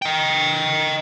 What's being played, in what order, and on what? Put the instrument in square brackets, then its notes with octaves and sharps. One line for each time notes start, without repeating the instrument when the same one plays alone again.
[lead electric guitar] D#5 G5